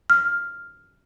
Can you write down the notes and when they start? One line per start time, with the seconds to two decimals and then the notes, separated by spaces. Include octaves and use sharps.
0.10 F6